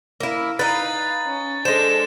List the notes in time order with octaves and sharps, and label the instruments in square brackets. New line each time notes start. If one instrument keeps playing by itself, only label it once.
[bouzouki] A#3 E4
[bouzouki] D#4 B4 [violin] F5 [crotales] A6
[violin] C#4
[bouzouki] G#3 C5 [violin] D4 A4 [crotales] E7